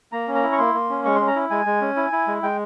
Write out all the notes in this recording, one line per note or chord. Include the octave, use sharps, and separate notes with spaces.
A#3 A#5
C#4
A#5
E4
C#6
A#3 C6
A#3
C#4
G#3 C#6
C#4 C6
A#5
E4
G#3 G#5
G#3
C#4
E4
E4
G#3
G#3 G5